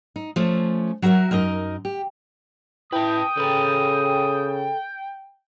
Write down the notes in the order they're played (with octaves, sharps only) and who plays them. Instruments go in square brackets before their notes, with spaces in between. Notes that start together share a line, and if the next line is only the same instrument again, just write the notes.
[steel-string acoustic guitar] D#4
F3 A3 C#4
F#3 F#4 A4 A#4 E5
F#2 D#4 A#4 D#5
G4
[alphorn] E4 [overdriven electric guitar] B4 A5 [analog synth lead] G5 [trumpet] D#6
[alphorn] C#3 [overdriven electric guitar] A4 B4